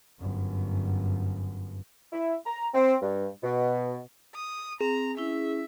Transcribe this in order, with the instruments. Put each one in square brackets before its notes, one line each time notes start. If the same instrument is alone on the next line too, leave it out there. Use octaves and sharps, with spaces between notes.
[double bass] G1 F#2
[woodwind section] E4
A#5
C4
G2
B2
[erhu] D#6
[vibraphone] C4 [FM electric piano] G#4 [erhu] A#5
[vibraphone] C#4 E4 [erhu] E5